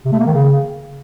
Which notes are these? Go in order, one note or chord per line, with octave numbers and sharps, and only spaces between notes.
C3
A3
A#3
D#3
C#3